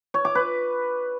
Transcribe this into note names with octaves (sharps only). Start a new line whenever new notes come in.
C#5
D6
B4